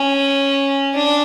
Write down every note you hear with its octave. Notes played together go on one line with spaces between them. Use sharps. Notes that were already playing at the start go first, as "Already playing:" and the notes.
Already playing: C#4
D4